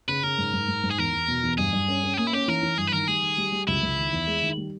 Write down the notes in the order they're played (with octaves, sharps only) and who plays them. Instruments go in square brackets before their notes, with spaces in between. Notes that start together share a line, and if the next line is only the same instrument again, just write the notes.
[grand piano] C#3 [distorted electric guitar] B4
[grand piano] C#3 [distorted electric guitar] A#4
[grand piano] G#2
G#2
G#2
G#2
[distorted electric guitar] G#4
[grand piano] E2 [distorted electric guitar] A#4
[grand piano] E2
B2
E2
[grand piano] G2 [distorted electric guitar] G#4
[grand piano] G2
C#4
C#4
[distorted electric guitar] G4
[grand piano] A#3 [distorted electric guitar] G#4
[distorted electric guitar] E4
[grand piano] C#4 [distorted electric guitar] G4
[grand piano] E3 [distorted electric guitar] A#4
[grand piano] E3
[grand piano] G2 [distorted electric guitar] G#4
[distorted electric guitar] B4
[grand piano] D#3 [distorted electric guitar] A#4
[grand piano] G3 [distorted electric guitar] G#4
[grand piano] D#3
G3
G3
[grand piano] C#2 [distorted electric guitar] E4
[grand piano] C#2
D#3
E2
G#3
D#3
G3